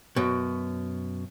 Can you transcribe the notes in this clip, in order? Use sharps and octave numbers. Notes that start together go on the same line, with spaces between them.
F#2 B2